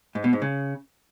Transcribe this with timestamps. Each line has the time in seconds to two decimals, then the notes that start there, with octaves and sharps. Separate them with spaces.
0.15 G#2
0.24 B2
0.33 G#2
0.42 C#3